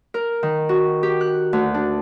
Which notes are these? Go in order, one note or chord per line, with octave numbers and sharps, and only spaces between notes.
A#4
D#3
F#4
G4
F#6
D2
D4